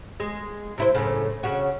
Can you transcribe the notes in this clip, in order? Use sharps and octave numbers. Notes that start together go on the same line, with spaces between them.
G#3
C3 E4 C5
F#2 A2 C#3
C#3 C#4 F#4